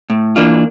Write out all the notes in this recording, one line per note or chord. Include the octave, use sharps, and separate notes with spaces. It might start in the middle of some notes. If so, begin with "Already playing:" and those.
A2
E3 A#3 D4 F4